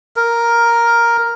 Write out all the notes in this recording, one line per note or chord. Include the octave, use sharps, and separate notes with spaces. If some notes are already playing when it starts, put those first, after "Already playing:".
A#4